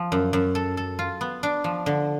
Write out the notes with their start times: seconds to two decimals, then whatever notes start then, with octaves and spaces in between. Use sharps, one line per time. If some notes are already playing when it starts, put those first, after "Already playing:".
Already playing: F3
0.12 F#2
0.33 F#2
0.55 A4
0.77 A4
0.99 F4
1.21 B3
1.43 D4
1.64 F3
1.86 D3